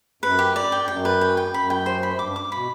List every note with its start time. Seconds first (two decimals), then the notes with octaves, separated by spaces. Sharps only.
0.22 F#2 B4
0.39 G4
0.55 G2 D5
0.63 F#2
0.71 G2 G5
0.82 G2
0.88 F#2 G5
1.05 B4
1.21 G5
1.37 G5
1.54 F#2 B5
1.70 G5
1.86 C5
2.03 B5
2.19 G2 D6
2.36 D6
2.52 B2 B5